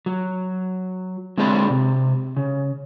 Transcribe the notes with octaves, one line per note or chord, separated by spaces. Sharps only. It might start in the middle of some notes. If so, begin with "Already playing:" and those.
F#3
D3 G#3 C4 G#4 D5 B5
C3
C#3